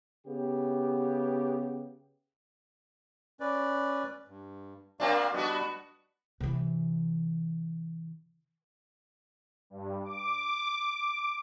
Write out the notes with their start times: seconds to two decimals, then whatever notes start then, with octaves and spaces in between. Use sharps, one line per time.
0.24 C#3 B3 G4
3.40 C#4 B4 D5
4.28 G2
5.00 A#3 C4 D4 F#4 F5
5.34 G3 B3 D4 F#4 D#5
6.40 C3 E3
9.70 G2
10.05 D6